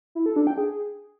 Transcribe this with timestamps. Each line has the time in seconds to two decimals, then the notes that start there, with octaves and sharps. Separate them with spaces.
0.15 E4
0.26 A4
0.36 D4
0.47 G5
0.58 G#4